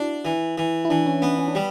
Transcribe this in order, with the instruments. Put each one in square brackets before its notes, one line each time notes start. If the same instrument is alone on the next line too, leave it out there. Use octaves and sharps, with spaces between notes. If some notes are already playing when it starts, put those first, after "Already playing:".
Already playing: [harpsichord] D4 [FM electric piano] E4 F#4
[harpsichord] E3
E3
[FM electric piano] E4
[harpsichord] E3 [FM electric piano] D4
[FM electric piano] C#4
[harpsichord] B3
[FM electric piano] C#4
D4
[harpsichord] G3